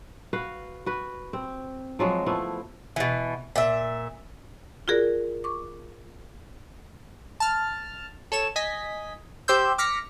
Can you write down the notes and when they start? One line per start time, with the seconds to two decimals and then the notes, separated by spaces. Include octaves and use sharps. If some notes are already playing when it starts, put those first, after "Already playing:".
0.33 F#4 B4 F5
0.86 F#4 B4
1.33 C4
1.99 F3 F#3 G#3 F#4
2.26 F3 A3 B3 E4
2.96 B2 E3
3.56 A#2 E5
4.88 F4 F#4 G#4 A#4 D5
5.44 C#6 D6
7.40 A5 F6
8.32 A4 C#5 E7
8.56 D#5 G#5 B6
9.48 G4 C5 C6 E6 G6
9.78 D6 F6 A#6 B6 C#7